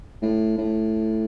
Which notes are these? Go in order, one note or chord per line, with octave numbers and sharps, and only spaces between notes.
A2
A2